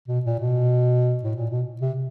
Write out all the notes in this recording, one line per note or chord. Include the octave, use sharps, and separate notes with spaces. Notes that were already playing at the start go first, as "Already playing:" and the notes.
B2
A#2
B2
A2
A#2
B2
C3